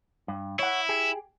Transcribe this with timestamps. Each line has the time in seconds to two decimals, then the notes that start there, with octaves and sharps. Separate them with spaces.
0.28 G2
0.59 E4 C#5 F#5
0.89 G4 G#4